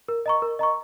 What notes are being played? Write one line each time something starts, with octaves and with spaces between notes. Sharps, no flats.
A#4
D#5 A#5 C#6
A#4
D#5 A#5 C#6